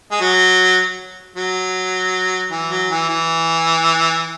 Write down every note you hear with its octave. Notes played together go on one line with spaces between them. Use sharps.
G#3
F#3
F#3
E3
F#3
E3
E3